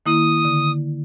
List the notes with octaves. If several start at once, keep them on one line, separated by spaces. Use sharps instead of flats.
D#3 A#3 E4 D#6
D3